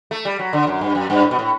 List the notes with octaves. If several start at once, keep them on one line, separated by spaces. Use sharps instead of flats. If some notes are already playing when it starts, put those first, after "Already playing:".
A3
G3
F#3
D3
F#2
G2
F#2
G2
A2
B2
A2